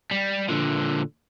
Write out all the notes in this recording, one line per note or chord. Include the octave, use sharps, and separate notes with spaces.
G3
A#2 D3